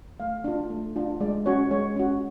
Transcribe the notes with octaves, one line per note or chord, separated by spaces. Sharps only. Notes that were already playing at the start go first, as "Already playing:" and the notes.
A3 F5
D4 F4
A3
D4 F4
G#3 D5
C#4 F#4 C#5
G#3 C#5
C#4 F#4